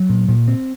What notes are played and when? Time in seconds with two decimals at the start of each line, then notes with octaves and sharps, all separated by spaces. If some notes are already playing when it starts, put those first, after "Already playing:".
Already playing: F#3
0.10 A#2
0.29 A#2
0.48 C4